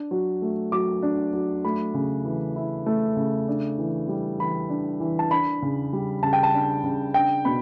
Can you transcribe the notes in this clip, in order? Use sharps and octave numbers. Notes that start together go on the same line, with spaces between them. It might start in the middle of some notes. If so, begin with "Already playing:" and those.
Already playing: D4
F#3
A3
F#3 D6
D4
F#3
A3 B5
C#3
E3
E4
A3
C#3
D4
E3
G3
E3 B5
D4
E3
A5
D4 B5
C#3
G3
C#3 A5
G5
A5
D4
C#3
D4 G5
B2 B5